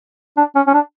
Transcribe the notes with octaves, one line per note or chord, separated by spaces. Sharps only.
D4
C#4
C#4
D4